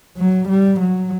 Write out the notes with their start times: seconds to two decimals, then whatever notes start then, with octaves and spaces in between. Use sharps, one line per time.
0.17 F#3
0.49 G3
0.80 F#3